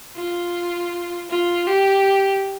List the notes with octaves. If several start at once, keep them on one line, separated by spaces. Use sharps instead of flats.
F4
F4
G4